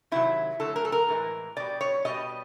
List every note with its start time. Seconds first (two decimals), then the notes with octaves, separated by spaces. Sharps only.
0.12 C3 D#3 F#3 E4
0.60 D3 F#3 A3 A4
0.76 A#4
0.85 A4
0.92 A#4
1.09 A2 E3 G#3
1.56 B2 G3 D5
1.81 C#5
2.05 B2 G3 D#5